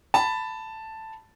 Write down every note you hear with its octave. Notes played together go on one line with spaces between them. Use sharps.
A5 B5